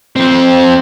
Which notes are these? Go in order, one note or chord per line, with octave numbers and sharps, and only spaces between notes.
F2 C4